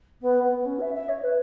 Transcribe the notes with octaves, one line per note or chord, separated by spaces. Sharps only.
B3
B3
B3
C#4
E5
E5
C#5
B4